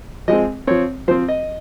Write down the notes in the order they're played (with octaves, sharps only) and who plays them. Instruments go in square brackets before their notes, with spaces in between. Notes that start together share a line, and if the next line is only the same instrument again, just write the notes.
[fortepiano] F3 G#3 C4 D#5
F3 C4 C#5
F3 C5
C4
D#5